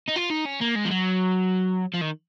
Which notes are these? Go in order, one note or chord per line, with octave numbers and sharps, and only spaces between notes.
D#4
F4
D#4
C#4
A#3
G#3
F3
F#3
F3
D#3